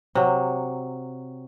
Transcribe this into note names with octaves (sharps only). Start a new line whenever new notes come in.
C3 F#3